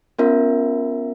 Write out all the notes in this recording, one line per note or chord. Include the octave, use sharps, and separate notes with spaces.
B3 C#4 F4 A#4 E5